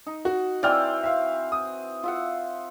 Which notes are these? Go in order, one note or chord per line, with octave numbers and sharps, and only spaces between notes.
D#4
F#4
E3 C4 F#4 D5 G5 F6
E5 F5
D#6
F4 E5 F#5